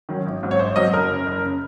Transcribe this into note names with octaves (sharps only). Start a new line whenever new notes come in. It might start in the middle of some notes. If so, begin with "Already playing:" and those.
D#3 F#3 C#4
G#1
G#2 F#3 C4
C#5
G#1 C5
G#2 F#3 C4 D#5
F#1 A#4
F#2 C#3
F#1
C#3